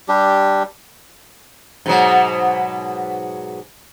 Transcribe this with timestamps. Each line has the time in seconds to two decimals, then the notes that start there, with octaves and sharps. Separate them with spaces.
0.08 G3 D4 G4
1.86 G#2 B2 F#3